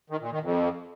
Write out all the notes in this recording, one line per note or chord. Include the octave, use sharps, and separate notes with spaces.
D#3
A#2
D#3
F2